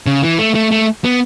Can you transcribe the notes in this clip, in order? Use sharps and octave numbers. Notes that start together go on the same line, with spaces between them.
C#3
E3
A3
A3
A3
B3